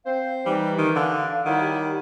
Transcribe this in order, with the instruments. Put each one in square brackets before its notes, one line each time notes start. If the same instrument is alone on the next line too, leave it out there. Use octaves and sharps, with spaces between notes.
[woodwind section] C4 C5 [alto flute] F5
[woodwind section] E3 [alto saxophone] G3 [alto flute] D#4
[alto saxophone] D#3 [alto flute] G4
[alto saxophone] D3 [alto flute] F5
[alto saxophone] D#3 [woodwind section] F#3 G3 E4 [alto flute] F#5
[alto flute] G4